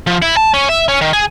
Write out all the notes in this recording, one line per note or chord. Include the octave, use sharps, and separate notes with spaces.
F3
E4
A5
C#4
E5
C#4
D#3
G#4